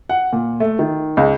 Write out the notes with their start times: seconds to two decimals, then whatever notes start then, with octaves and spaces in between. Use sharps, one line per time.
0.09 F#5
0.33 A#2
0.60 A3
0.79 D#3
1.17 C#2